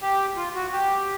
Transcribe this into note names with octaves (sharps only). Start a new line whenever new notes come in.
G4
F4
F#4
G4